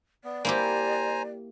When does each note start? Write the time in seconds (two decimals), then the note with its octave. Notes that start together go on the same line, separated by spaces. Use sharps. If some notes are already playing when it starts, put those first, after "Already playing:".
0.25 B3 D5
0.45 A#3 E4 G4 C5 G#5 A#5